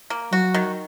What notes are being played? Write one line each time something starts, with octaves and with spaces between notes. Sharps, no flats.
A#3
F#3 F#4
D#3